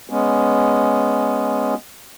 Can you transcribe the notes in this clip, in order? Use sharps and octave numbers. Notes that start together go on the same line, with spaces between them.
G#3 B3 C#4